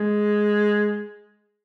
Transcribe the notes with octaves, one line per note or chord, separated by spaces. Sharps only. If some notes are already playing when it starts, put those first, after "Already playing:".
Already playing: G#3